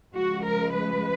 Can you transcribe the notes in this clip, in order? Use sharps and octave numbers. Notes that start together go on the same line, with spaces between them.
C#3 F3 G#3 F#4
A#4
B4